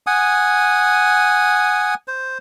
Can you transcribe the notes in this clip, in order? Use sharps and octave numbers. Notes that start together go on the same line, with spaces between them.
F#5 G#5 D#6
C5